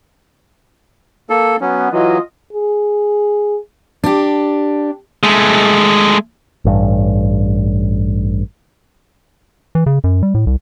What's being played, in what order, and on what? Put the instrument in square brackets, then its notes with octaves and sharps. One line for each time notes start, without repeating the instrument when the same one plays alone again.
[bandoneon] A#3 A4
[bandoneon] F#3 C#4 [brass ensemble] B3
[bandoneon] E3 F#3 [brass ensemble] F4 D#5
[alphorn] G#4
[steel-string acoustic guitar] D4 G4
[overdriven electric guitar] G#3 A3
[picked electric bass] A1 G2
[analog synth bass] E3
C#3
F#2
G3
A2
C2